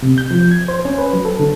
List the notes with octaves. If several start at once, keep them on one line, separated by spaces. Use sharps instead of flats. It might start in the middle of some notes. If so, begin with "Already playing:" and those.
C3
G6
F3
G#6
C5
C#4
B4
F#3
A4
D3